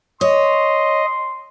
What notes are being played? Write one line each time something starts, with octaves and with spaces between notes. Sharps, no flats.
C#5 D#5 C6